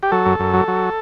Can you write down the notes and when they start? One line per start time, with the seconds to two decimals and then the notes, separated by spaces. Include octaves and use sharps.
0.03 G4
0.12 F#3 A4
0.26 F#2
0.39 F#2
0.54 F#3
0.68 F#3